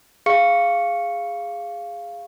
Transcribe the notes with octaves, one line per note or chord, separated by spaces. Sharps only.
G#4 F5 C#6 C#7